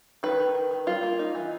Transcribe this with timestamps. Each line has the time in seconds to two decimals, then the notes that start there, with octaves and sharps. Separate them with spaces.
0.23 D#3 B4
0.40 D#3
0.55 D#3
0.71 D#3
0.87 G3 F4
1.03 A#3
1.19 D#4
1.35 E3